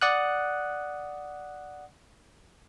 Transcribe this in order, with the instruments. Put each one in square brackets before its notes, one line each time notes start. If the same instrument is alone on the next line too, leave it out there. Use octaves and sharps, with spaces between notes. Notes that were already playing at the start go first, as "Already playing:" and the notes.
[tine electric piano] D5 F#5 D#6 F#6